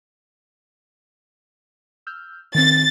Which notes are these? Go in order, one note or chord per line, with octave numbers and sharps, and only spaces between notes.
E6 F6 G6
D#3 C4 A6